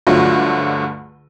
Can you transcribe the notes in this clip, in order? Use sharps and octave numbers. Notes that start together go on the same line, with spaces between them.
C#2 G2 D3 F3 F#3 A3